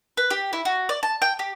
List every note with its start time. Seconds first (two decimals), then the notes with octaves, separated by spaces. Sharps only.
0.17 B4
0.31 G4
0.53 E4
0.65 F#4
0.89 D5
1.03 A5
1.22 G5
1.39 G4